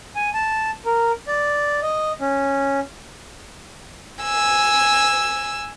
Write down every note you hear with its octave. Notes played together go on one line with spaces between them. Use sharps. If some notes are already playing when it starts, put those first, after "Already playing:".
G#5
A5
A#4
D5
D#5
C#4
G#5 E6